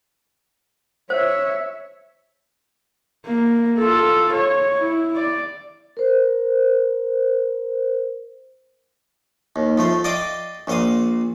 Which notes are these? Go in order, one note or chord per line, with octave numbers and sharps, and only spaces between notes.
C5 C#5 E5
A#3
F4 A4
C#5
E4
D5
A#4 C5
D#2
F3 A3 C5
D5 D#5 F5 G5 D6 D#6
A#1 A#2 C5 F5 D#6